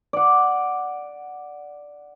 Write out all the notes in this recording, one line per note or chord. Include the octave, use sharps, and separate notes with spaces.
D5 F#5